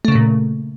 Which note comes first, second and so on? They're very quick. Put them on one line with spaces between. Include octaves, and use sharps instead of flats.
A3 C#3 A#3 A#2